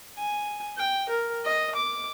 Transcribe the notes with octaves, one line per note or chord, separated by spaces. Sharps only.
G#5
G5
A#4
D#5
D6